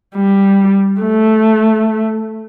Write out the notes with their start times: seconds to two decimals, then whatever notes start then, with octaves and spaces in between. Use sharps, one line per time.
0.16 G3
1.02 A3